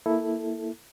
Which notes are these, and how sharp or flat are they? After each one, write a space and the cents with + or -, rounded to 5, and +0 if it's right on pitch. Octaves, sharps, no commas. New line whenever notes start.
A#3 +0 E4 +0 A4 +0